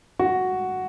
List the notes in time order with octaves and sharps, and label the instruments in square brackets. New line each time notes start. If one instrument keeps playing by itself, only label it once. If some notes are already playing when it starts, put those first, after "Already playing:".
[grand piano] F#4